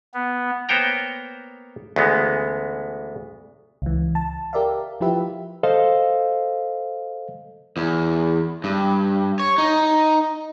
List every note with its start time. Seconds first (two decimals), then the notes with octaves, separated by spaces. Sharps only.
0.14 B3
0.69 A#3 B3 C5 C#5 G5 A#5
1.96 D2 C#3 E3 G#3 B3
3.82 C#2 E3
4.15 A5
4.53 G4 A#4 D5 E5 F5
5.01 F3 E4 F4 G4 B4 E5
5.63 A4 C5 D#5 F5
7.77 E2
8.64 G2
9.40 C#5
9.58 D#4